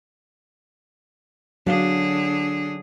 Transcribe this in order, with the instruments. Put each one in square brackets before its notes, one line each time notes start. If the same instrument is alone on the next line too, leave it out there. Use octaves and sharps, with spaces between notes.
[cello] D3 G#4 [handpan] F#3 [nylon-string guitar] D4 F5